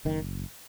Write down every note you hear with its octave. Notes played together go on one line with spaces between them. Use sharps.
F#1 D#3